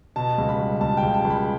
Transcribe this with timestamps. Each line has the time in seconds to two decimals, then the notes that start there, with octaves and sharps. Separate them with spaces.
0.16 B2 A5
0.38 C#2
0.49 B5
0.59 G3
0.81 C#2 A5
0.97 G5
1.03 C#2
1.14 A5
1.25 C#2
1.30 B5